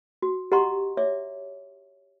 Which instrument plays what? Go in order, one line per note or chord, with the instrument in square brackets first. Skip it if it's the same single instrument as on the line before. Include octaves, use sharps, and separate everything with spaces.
[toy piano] F#4
G4 D#5 F#5 A#5 C6 C#6
C#5 E5 D6